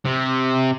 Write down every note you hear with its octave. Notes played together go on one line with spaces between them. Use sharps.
C3